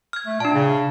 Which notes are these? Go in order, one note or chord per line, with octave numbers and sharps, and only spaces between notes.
F6 G#6
A3
A#2 D4 A5
C#3